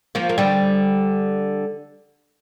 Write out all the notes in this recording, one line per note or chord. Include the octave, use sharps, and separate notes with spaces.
F3 A#3
A#3
D3 G3